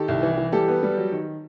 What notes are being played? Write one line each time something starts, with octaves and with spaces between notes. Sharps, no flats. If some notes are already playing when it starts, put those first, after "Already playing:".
Already playing: D#3 G4 A4
C2
E3
E3
G3 G4 A4
B3
G3
F#3
D#3